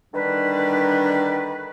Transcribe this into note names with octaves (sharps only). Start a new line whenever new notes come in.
D3 D#3 G3 D4 B4